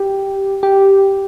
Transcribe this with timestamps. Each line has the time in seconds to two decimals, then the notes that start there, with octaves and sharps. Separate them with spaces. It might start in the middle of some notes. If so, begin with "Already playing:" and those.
Already playing: G4
0.63 G4